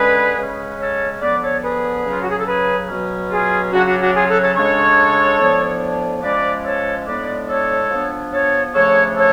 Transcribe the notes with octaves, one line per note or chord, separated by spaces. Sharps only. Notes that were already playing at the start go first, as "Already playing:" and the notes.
Already playing: D3 G#3 C#4 G#4 B4
C#3 G#3 C#4
A4 C#5
D3 F3 B3 B4 D5
A4 C#5
G#4 B4
C#3 F#3 C#4
F4
F#4
G#4
A4
G#4 B4
B2 F#3 C#4
F4 G#4
C#3 F#3 C#4 D4 F#4
D4 F#4
D4 F#4
F4 G#4
F#4 A4
A4 C#5
C#3 G#3 D4 A4 C#5
A2 F3 B3 D4
F3 G#3 C#4 B4 D5
A4 C#5
A2 G#3 B3 D4 B4 D5
A4 C#5
F3 B3 D4
A4 C#5
C#3 F3 A3 D4 A4 C#5
A4 C#5